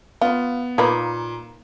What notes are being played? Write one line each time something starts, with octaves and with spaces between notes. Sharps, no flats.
B3 F4
A#2 A#3 D#4 B4